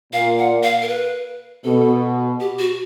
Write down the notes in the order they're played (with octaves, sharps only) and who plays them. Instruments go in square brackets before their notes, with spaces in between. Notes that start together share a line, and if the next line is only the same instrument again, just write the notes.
[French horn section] A#2 [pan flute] F5
[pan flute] F#5
F5
A#4
B4
[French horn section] B2 [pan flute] A4
[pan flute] G4
F#4